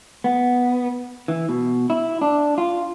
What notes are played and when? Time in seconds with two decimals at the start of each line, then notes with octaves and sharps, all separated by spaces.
0.24 B3
1.28 E3
1.49 B2
1.90 E4
2.21 D4
2.58 F4